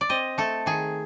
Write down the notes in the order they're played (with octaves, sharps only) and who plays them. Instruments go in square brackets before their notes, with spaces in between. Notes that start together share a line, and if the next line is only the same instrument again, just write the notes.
[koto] D5
C4 D#5
A3 A4
D#3 G#4